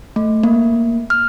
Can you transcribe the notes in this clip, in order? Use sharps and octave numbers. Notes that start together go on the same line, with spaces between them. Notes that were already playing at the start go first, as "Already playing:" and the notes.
A3
A#3
F6